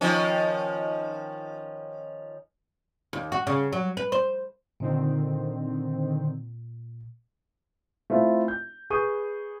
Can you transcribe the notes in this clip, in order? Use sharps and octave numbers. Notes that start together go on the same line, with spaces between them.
D#3 F3 C#4
D#2
F#4
C#3
F#3
B4
C5
A#2 D3 D#3 C4
A3 C4 E4 F4
G6
G#4 B4 C#6 D#6 G6 D#7